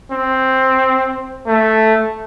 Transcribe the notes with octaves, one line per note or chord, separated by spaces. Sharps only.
C4
A3